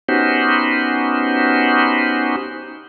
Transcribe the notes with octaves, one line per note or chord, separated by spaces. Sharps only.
B3 C#4 D#4 F#4 G4 C5